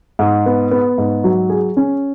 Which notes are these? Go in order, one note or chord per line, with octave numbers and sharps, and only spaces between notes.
G#2
B3
B3
G#2
F#3
G#4
C#4